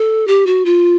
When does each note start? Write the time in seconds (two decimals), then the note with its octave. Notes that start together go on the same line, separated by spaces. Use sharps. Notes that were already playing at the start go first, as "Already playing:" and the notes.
Already playing: A4
0.27 G4
0.46 F#4
0.65 F4